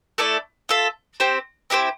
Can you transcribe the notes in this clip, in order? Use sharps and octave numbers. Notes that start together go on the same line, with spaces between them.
A3 E4 A4 D5
F4 A4 E5
C4 G4 C5
C4 E4 G4 C5